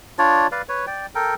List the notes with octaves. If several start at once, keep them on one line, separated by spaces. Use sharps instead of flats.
D4 F4 C#5 D5
B4 D5 F5
B4 C#5
D5 G5
A4 A#4 G5